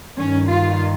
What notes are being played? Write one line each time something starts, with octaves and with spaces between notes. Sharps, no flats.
G2 D#3 C#4
F4